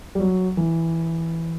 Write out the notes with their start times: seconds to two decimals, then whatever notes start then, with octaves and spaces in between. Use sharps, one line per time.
0.15 G3
0.20 F#3
0.57 E3